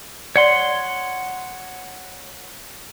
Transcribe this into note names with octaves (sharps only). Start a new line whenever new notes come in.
C#5 D5 F#5 C6